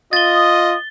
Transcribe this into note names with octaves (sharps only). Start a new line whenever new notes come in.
F4 D#5 D#6 A6 G7